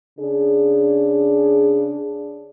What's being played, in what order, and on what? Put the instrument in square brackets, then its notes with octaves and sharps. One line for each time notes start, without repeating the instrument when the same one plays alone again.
[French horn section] C#3 D4 G#4